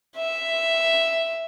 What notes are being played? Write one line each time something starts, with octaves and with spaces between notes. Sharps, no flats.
E5